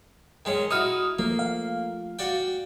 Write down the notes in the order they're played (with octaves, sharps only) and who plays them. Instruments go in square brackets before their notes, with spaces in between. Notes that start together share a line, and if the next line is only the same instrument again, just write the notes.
[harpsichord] D#3 G#3 C#4
[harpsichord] D#4 E4 F#4 [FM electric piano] D#6 F6
[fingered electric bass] F3 A3 [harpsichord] A#3
[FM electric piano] F5
[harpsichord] F#4 D5 G5